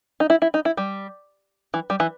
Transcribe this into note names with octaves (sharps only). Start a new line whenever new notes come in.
D#4
E4
E4
D#4
E4
G3
E3
G3
E3